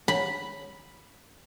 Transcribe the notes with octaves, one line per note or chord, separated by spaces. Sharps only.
B5